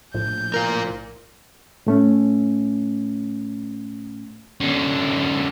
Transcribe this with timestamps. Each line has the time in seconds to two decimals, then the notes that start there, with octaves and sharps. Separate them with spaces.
0.14 A#1 A2 F3 G6
0.54 F4 A#4
1.87 A2 A3 C#4
4.60 F#2 D3